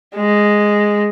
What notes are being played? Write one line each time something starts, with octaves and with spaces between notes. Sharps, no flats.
G#3